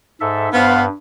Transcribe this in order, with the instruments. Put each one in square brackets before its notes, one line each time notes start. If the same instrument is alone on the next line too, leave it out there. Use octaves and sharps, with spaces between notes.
[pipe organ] G#2 A4 E5
[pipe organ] G2 [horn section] B3 C5 F5